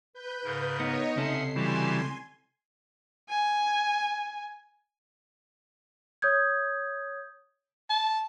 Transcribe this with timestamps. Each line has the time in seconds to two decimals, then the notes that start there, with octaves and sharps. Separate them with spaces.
0.13 B4 G6
0.45 G#2 C#3 A#4
0.80 B3 D#4 C#5 D#5
1.16 C#2 C3 C#4 A4 E5 F#5 C7
1.56 E3 G3 F#4 G4 G#5 A5 C6
3.29 G#5
6.22 C#5 D#6 G6 G#6
7.90 A5